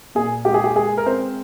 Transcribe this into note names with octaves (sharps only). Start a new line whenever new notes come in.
A#2 G#4
G#3 G4
G#4
G4
G#3 G#4
A#4
C4 C5